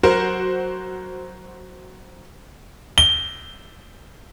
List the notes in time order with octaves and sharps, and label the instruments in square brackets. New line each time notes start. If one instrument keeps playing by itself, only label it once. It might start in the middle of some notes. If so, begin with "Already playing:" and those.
[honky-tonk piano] F#3 F#4 A#4 C5
[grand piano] G7